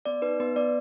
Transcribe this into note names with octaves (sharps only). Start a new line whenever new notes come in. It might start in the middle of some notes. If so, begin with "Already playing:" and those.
B3 D5
D#4 B4
B3 B4
B3 D5